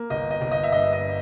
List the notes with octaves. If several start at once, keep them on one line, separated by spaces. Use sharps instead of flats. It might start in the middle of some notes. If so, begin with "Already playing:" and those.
Already playing: A#3
G1 D#5
D#5
G1
D#5
E5
G2 D#5
D#5